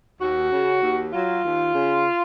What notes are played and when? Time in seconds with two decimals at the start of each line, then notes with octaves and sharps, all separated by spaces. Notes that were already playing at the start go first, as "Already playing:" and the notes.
0.21 D#2 F#4
0.52 C#3
0.82 D#2
1.13 F#3 F4
1.44 D#2
1.74 C#3